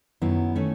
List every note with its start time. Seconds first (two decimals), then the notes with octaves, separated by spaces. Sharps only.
0.22 F#2 D#3 F#3 B3 E4
0.56 D#3 A3 C#4